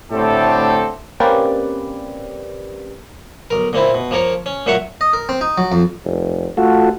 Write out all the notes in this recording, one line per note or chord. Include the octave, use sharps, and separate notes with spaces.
A2 D3 A3 C4 G4 A4
A#3 C4 C#4 G4 B4 D5
B1 A#4
A#2 A#3 C4 E4
B2
F3 A#3 A#4 C#5
C#4
A#2 F#3 A#3 E5 F#5 C#6
D#5
A#4
C4
D#4
F#3
F2
F1
A3 F4 F#4 A4